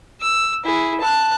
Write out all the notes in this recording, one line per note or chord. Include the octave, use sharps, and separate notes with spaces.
E6
E4 G#4
A5 F#6